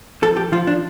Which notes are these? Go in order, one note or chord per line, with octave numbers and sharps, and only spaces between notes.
F3 A4
G4
F3 F4
D4